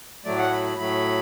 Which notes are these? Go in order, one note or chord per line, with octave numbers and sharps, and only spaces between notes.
A2 F#3 A3 D5
F#5
B5
B5
A2 F#3 A3 B5